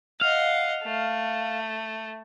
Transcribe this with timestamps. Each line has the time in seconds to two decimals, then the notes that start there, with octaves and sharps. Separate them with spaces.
0.21 D#5 F5 F#5
0.84 A3